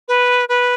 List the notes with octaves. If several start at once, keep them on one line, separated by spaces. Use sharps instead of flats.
B4
B4